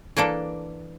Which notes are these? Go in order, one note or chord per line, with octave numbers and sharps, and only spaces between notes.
E3 A#3 D4 A4